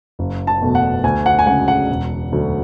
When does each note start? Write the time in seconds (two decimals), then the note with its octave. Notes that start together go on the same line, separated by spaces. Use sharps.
0.19 F#1
0.47 A5
0.61 E2 B2 A3
0.75 F#5
1.03 D2 G#5
1.26 F#5
1.39 G#5
1.46 C#3 G#3 F#5
1.68 F#5
1.90 E1
2.32 D2 D3 F#3